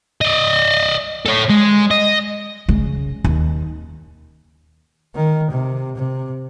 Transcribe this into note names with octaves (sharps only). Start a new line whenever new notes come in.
D5 D#5
A4 C#5
G#3
D#5
C#3
D#2
D#3
C3
C3